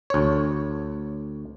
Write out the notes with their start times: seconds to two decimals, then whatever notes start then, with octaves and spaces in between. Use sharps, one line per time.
0.10 D2 C#5